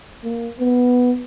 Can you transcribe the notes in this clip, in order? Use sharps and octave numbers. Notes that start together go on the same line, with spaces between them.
A#3
B3